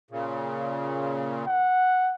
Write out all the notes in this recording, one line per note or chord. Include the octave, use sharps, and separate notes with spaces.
A#2 C#3
F#5